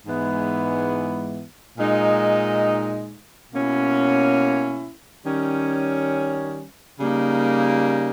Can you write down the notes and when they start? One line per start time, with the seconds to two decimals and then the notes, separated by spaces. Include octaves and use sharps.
0.05 G#2 E3 G#3 B3 E4
1.78 A#2 G#3 D#4
3.52 B2 A#3 C#4 E4
5.25 D#3 G3 C#4
6.99 C#3 G3 A#3 D#4